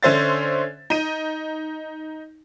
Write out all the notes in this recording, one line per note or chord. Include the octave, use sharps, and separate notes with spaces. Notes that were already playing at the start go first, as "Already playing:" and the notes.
D3 C#4 C5 E5 A6
D#4 D#7